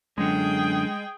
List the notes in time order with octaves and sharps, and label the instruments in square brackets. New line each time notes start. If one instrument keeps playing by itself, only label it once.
[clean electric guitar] F#2 D3 [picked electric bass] G#3 [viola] G#4 G5